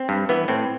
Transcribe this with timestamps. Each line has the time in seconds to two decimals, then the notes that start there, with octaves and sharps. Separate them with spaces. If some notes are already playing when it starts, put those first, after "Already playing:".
Already playing: C4
0.09 G2
0.29 E3 B3
0.48 A2 C4